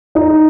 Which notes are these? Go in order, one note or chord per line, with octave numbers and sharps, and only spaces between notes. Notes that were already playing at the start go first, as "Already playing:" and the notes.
D#4